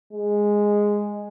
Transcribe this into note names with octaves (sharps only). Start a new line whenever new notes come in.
G#3